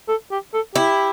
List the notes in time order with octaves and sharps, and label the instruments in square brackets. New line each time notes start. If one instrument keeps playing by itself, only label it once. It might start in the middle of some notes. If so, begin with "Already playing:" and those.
[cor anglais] A4
G4
A4
[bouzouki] E4 [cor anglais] G4